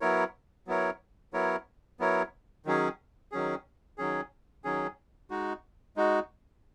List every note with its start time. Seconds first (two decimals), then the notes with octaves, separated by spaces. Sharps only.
0.01 F#3 B3 E4 A#4 C#5
0.67 F#3 B3 E4 A#4 C#5
1.33 F#3 B3 E4 A#4 C#5
1.99 F#3 B3 E4 A#4 C#5
2.65 D#3 F#3 C#4 G#4
3.32 D#3 F#3 C#4 G#4
3.98 D#3 F#3 C#4 G#4
4.64 D#3 F#3 C#4 G#4
5.30 G#3 D#4 F#4
5.96 G#3 D#4 F#4